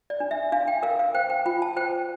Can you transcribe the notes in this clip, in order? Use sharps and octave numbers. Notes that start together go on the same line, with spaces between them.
D5
D4
E5
D4 F5
G5
A#4 F5
F5
C5 G5
G5
F4 G5
A5
C5 G5